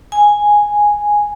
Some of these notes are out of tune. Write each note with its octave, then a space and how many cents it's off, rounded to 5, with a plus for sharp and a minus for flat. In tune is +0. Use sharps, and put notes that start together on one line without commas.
G#5 -5